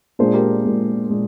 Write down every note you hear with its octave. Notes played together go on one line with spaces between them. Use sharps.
A#2 G#3 D4 G#4 C5
G4 A#4
A#2 G#3 D4
A#2 G#3 D4